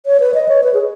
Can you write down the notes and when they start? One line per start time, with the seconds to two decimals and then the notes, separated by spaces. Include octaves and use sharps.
0.06 C#5
0.20 B4
0.34 D#5
0.49 C#5
0.64 B4
0.74 G#4